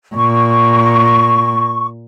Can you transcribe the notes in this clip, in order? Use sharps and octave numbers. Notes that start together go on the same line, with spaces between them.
A#2 C#6